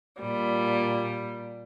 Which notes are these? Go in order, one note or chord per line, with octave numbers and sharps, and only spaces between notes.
A#2 G3